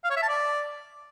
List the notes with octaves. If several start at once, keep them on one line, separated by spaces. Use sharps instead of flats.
F5
C#5
E5
A5
D5